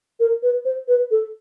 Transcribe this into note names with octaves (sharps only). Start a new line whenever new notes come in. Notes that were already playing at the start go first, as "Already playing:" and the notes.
A#4
B4
C5
B4
A4